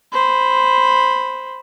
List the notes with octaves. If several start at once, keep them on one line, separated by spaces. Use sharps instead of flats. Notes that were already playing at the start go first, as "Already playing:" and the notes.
C5 B5